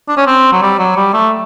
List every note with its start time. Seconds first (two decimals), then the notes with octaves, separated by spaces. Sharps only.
0.08 D4
0.17 C#4
0.26 C4
0.52 F#3
0.62 G3
0.79 F#3
0.96 G3
1.14 A3